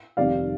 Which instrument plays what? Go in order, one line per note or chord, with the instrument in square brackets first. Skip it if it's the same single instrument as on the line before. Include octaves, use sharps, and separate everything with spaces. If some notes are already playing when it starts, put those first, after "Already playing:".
[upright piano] F1 F2 D#3 G3 D5 F5